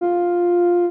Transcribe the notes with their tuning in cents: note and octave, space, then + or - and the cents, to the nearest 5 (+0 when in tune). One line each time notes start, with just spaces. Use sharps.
F4 +5